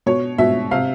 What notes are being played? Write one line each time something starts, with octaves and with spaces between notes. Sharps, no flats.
B2 C#5
B2 E5
C3 F5